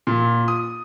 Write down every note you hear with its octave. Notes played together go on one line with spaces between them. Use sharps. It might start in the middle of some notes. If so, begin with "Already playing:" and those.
A#2
D#6